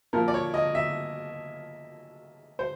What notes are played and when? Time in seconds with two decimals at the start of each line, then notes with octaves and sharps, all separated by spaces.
0.13 A#2 F3 A#4
0.28 D5
0.34 C#5
0.54 D#5
0.75 E5
2.59 C5